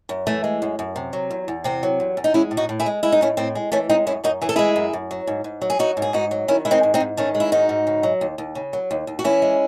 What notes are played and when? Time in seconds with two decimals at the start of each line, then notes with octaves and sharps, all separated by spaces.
0.09 F#2
0.27 E3 A3
0.44 G#3
0.62 F#2
0.79 F#2
0.96 C3
1.13 F#3
1.30 E2
1.48 E2
1.64 C3 C4
1.83 F#3
2.00 E2
2.17 E2
2.24 D#4
2.34 G#3 C#4 E4
2.51 A2
2.57 D#4 F#4
2.69 A2
2.80 E4 G#4
2.86 G#3
3.03 G#3 E4
3.12 D#4
3.21 A2 C#4 E4
3.37 A2 C4
3.55 G#3
3.72 E3 A3 C#4
3.89 G#3 C4 D#4
4.07 F#2 C#4 E4
4.24 F#2 D#4 F#4
4.42 E3 G#4
4.49 A4
4.56 G#3 E4 G#4
4.76 F#2
4.93 F#2
5.11 F#3
5.27 G#2
5.44 G#2
5.62 F#3
5.70 G#4
5.79 F#3 D#4 F#4
5.97 G#2
6.02 G#4
6.13 G#2 D#4 F#4
6.31 F#3
6.48 D#3 C#4 E4
6.65 G#3 E4
6.71 C4 D#4
6.83 G#2
6.94 C4 D#4
7.00 G#2
7.17 D#3 A3 C#4
7.35 G#3
7.40 E4
7.52 G#2 D#4 F#4
7.69 G#2
7.87 C#3
8.03 F#3
8.21 D#2
8.38 D#2
8.55 C#3
8.73 F#3
8.91 D#2
9.07 D#2
9.19 F#4
9.24 E3 C#4 E4
9.42 G#3